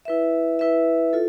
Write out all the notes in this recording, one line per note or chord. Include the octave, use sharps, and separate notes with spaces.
E4 B4 E5
E4 B4 E5
F4 A4